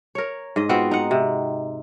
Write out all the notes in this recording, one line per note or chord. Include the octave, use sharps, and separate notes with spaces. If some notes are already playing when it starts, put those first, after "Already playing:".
A#4 C#5
G#2 D#5
B3 C4 F4 F#4
D#4 F#5
C3